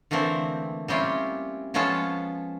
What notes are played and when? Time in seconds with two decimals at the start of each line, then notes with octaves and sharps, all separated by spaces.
0.11 D3 E3 A3 A#3 C4
0.88 G3 C4 C#4 E4 F4
1.74 F3 G#3 B3 C#4 F4 A4